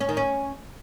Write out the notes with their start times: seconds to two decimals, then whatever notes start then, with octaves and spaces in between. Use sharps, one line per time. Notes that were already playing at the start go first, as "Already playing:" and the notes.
0.01 C#4
0.09 D#3
0.17 C#4